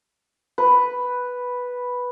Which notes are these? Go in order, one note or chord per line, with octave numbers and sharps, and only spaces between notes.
B4